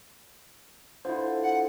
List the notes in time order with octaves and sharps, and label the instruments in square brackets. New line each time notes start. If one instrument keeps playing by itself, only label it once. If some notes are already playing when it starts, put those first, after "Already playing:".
[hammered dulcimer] D3 F3 [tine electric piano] E4 C5
[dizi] F#5